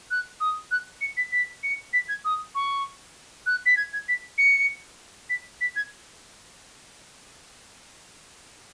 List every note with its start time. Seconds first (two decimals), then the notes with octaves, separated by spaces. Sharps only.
0.11 F#6
0.41 D#6
0.71 F#6
1.01 C#7
1.17 B6
1.32 B6
1.63 C#7
1.93 B6
2.09 G#6
2.25 D#6
2.55 C#6
3.46 F#6
3.66 B6
3.77 G#6
3.93 G#6
4.08 B6
4.38 C#7
5.30 B6
5.61 B6
5.76 G#6